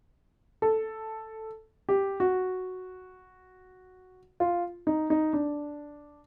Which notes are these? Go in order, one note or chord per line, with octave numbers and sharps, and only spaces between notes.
A4
G4
F#4
F4
D#4
D#4
D4